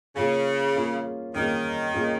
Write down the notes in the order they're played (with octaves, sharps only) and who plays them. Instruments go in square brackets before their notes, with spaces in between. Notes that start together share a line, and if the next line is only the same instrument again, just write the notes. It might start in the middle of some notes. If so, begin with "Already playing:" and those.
[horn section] C#3 [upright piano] A#3 C#4 F4 G#4
[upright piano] A#3 C#4 F4 G#4
[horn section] D#3 [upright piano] A#3 C#4 F4 G#4
[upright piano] A#3 C#4 F4 G#4